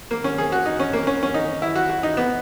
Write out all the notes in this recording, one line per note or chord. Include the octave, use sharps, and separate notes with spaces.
A#3
C#4
G#4
F#4
D#4
C#4
A#3
C#4
C#4
D#4
E4
F#4
F#4
D#4
B3